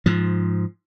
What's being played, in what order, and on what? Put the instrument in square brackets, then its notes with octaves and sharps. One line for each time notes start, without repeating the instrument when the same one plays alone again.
[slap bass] G#2 F3